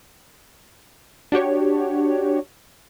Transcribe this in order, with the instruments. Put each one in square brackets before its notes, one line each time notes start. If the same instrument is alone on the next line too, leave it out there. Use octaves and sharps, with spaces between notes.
[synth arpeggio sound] D4 F#4 G4 C#5